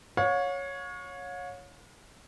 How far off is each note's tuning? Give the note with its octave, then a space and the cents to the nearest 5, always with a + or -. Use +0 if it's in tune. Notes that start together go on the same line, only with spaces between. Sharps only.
C#5 +0 F5 +45